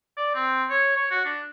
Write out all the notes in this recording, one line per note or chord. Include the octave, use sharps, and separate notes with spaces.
D5
C4
C#5
C#5
F#4
D4